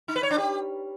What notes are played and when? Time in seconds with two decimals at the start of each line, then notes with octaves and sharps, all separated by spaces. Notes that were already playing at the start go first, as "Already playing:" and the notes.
0.08 D#4
0.16 B4
0.23 C#5
0.31 D4
0.38 G4